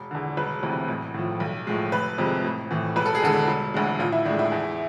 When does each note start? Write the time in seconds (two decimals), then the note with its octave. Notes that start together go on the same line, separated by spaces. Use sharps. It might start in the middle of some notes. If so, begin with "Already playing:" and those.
Already playing: E1
0.11 E2 D3
0.37 E1 B4
0.63 D2 C3 E3
0.88 A1
1.14 A2 F3
1.40 B1
1.67 A2 F3 G#3
1.92 F1 B4
2.18 F2 C3 G#3
2.44 A1
2.71 A2 E3
2.96 E1 B4
3.06 A4
3.15 G#4
3.22 E2 D3 G#3 A4
3.48 E1
3.74 D2 D3 G#3
3.99 A1 F4
4.12 E4
4.25 A2 G#3 D4
4.39 E4
4.52 E2